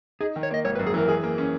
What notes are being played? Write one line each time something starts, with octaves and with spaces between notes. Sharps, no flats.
D#4 G#4
D#3
C#5
A#3 D#5
G#1 C#5
B4
F#2
G#4
E3 A#4
G#4
A#3
C#4